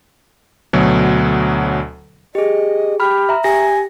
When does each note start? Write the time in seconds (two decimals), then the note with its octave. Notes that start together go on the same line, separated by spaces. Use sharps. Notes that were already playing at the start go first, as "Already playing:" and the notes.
0.73 D2 B2 F#3
2.35 G4 G#4 D#5
3.00 G4 B5 F6
3.29 E5 A#5
3.44 G4 G#5 A#6